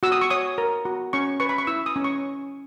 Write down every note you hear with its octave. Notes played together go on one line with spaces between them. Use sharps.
F#4 E6
D#6
C#6
C#5 D#6
A#4
F#4
C#4 C#6
B4 C#6
B5
C#6
E4 E6
D#6
C#4
C#6